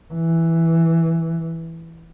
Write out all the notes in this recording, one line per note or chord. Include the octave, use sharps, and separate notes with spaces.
E3